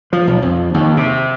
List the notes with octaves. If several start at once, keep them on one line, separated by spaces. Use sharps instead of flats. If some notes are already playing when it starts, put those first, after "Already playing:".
F3
B1
F2
D#2
C3